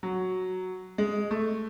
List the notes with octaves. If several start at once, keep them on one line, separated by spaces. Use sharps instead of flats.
F#3
G#3
A3